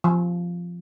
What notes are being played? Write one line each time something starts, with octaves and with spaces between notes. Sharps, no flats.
F3